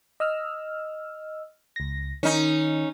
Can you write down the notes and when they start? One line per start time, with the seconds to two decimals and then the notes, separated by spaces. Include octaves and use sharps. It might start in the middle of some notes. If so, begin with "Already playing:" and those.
0.20 D#5 E6 F6
1.76 C#2 A#6
2.23 D#3 C#4 D#4